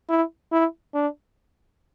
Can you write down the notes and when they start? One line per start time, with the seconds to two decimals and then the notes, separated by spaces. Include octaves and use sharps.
0.09 E4
0.52 E4
0.95 D4